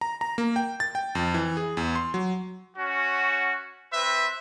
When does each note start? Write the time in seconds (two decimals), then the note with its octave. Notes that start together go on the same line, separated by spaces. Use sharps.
0.01 A#5
0.21 A#5
0.38 A#3
0.56 G5
0.80 A6
0.95 G5
1.15 F2
1.34 E3
1.57 G#4
1.77 E2
1.95 C6
2.14 F#3
2.76 C#4 F#4
3.93 C4 B4 E5